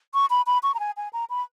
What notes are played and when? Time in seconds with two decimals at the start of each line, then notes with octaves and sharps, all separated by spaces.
0.14 C#6
0.30 B5
0.47 B5
0.63 C#6
0.74 A#5
0.79 G#5
0.97 G#5
1.13 A#5
1.30 B5